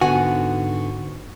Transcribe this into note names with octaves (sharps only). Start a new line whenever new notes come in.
G#2 D3 B3 F#4 G#5